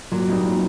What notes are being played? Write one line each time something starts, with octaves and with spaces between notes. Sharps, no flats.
A#2 F#3
G3 C4 D#4
A#2